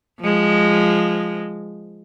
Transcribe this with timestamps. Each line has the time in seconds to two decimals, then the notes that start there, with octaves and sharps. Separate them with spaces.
0.21 F3 G#3